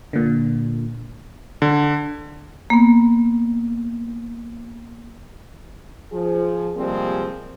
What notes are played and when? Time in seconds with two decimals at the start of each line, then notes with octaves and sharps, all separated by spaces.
0.13 A#2 D3
1.62 D3
2.70 A#3 B3
6.12 F3 G#4
6.77 C3 F3 G3 G#3 A#3 C4